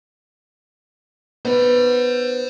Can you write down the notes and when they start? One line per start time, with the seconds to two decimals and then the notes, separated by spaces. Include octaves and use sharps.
1.45 B3 C5 F#5